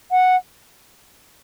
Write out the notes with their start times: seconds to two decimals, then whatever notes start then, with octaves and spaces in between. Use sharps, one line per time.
0.11 F#5